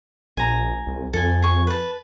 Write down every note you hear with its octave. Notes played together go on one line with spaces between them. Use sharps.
A#1 G#5 A#5
C2
F2 A4 G#5
G#4 C#6
B4 A5